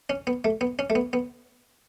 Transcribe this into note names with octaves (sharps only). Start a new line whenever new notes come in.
C#4
B3
A3
B3
C#4
A3
B3
B3